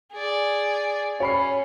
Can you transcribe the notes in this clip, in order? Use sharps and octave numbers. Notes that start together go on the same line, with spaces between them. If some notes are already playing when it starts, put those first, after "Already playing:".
G#4 D5
C#4 C#5 B5 C7